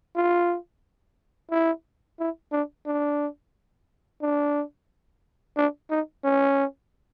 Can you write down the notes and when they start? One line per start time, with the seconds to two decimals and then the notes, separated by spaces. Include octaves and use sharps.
0.16 F4
1.51 E4
2.19 E4
2.52 D4
2.87 D4
4.22 D4
5.57 D4
5.91 D#4
6.24 C#4